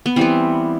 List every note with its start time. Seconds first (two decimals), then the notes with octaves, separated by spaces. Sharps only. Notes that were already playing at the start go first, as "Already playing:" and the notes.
0.06 B3
0.16 E3 G3 B3 C4